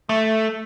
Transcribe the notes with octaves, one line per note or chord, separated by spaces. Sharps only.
A3